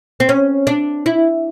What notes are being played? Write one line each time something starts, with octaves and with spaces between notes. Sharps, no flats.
C4
C#4
D4
E4